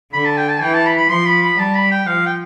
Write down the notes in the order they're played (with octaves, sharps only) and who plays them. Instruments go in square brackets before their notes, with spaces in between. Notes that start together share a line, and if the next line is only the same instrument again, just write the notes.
[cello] D3 [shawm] B5
[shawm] A5
G5
A5
[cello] E3 [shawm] G5
[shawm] A5
B5
B5
[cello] F3 [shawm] C6
[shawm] B5
B5
[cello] G3 [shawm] A5
[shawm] B5
G5
[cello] F3 [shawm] F5
[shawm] G5